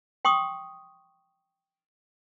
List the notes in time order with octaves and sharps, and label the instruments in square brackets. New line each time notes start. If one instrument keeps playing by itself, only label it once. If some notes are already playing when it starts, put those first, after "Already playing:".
[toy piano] G5 C6 C#6 D#6